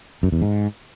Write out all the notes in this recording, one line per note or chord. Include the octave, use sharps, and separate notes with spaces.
F#2
E2
G#2